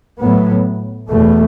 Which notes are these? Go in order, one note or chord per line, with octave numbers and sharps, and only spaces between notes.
A2 F#3 B3
E2 B2 A3